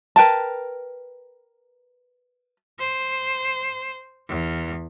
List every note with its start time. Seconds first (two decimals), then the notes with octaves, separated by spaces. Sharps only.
0.16 A#4 B4 G5 A5
2.79 C5
4.29 E2